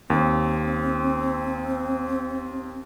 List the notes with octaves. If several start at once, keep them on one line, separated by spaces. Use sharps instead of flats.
D#2 C4